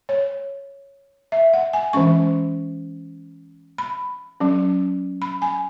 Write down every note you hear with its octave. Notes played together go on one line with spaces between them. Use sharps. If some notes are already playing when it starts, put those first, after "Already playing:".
C#5
E5
F#5
G#5
E3 G#3 C#4 C#6
B5
F#3 C#4
B5
G#5